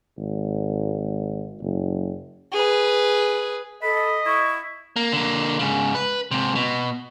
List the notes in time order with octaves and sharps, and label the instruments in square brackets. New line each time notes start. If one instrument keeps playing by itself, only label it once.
[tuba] G#1
F#1
[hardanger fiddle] G#4 B4
[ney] A4 [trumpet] D#5 [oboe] B5
[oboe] E4 [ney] C#6
[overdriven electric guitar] A#3
D3 A#3
G#2 C#3
B4
G#2 C3
B2